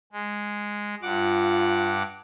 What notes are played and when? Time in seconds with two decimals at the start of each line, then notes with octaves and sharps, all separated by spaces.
0.12 G#3
1.02 G2 F4 F#5 D6